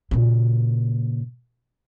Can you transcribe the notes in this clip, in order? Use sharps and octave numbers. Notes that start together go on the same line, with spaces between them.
A#2 C#3